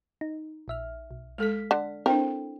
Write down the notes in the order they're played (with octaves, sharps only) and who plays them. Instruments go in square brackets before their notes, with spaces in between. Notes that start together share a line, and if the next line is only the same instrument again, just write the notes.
[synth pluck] D#4
A#1 E5 F6
B1
[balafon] G#3 A4 [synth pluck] F6 B6
[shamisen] D3
[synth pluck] C4 E4 A4 [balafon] D4 C5 G5 [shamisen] A#4